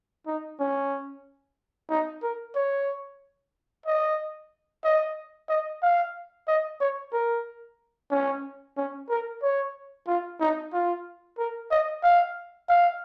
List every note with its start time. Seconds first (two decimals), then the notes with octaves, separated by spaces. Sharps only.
0.27 D#4
0.59 C#4
1.90 D#4
2.22 A#4
2.55 C#5
3.86 D#5
4.84 D#5
5.49 D#5
5.82 F5
6.48 D#5
6.80 C#5
7.13 A#4
8.11 C#4
8.77 C#4
9.10 A#4
9.42 C#5
10.07 F4
10.40 D#4
10.73 F4
11.38 A#4
11.71 D#5
12.03 F5
12.69 F5